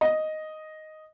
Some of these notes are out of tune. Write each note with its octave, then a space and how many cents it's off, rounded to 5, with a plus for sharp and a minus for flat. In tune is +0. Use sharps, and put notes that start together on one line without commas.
D#5 +0